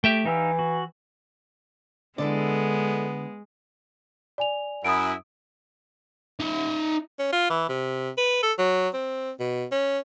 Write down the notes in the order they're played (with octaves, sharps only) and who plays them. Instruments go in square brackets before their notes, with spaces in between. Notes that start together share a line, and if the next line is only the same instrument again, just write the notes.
[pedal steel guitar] A3 [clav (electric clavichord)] G4 E5 G5
[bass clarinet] E3 [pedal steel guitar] D#4 F5 E6
[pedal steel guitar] F#4
[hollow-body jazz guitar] D3 [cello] G#3 [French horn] B3 [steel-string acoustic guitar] E4 A4 D5
[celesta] D5 G#5 F7
[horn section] F#2 E4 [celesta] D#6 D7
[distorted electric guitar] D#4 E5
[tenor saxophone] C#4
F4
E3
C3
B4
A4
F#3
C4
B2
C#4